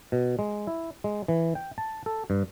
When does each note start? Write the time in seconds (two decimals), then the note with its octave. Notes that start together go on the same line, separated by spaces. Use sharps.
0.12 B2
0.39 G#3
0.67 E4
1.04 G#3
1.28 E3
1.55 G5
1.78 A5
2.06 A4
2.30 G2